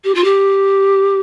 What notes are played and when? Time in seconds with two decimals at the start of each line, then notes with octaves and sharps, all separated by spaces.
0.04 G4
0.14 F4
0.24 G4